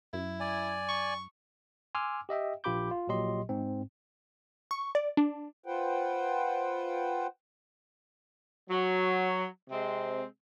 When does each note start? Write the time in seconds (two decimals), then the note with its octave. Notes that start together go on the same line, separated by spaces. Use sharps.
0.13 F#2 E4
0.40 D5 G#5
0.89 C#6
1.95 G#5 C6 D6 E6 F6
2.29 G4 D#5 E5 G5
2.64 A#1 F4 G4 B5 D6 G6
2.91 F4
3.08 A#1 A#2 F#3 G4 D#5 C6
3.49 G#2 C4
4.71 C#6
4.95 D5
5.17 D4
5.66 F4 B4 C5 F#5 G5
8.70 F#3
9.70 C3 G#3 C4